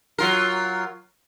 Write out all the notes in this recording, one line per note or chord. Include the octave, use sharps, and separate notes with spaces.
F#3 F4 A#4